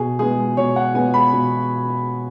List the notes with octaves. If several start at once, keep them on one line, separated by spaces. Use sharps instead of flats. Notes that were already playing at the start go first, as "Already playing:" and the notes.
Already playing: B2 G#4
G#3 B3 G#4
B2 C#5
F#5
G#3 B3 G#5
B5
B2